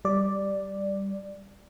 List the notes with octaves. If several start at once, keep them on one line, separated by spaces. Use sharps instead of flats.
G3 D5